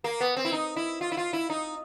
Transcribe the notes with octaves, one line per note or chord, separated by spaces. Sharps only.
A#3
B3
C4
E4
D#4
E4
F4
E4
F4
E4
D#4